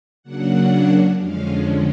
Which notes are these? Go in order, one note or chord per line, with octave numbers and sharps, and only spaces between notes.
C#3 F#3 A#3 D4 F#5
F2 D3 F3 G#3 C#4 F5